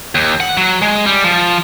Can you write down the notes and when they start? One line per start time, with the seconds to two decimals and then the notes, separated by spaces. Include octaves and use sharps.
0.15 D#2
0.40 F#5
0.57 F#3
0.82 G#3
1.06 G3
1.24 F3